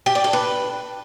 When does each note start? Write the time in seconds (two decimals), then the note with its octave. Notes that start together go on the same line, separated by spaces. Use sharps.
0.06 G4
0.15 D5
0.24 A4
0.33 B4